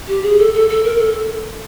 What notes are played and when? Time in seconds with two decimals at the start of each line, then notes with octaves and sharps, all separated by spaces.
0.08 G4
0.23 G#4
0.39 A4
0.54 A4
0.69 A4
0.84 A#4
0.98 A4